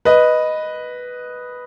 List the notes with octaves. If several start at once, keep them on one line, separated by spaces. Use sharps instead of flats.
B4 D#5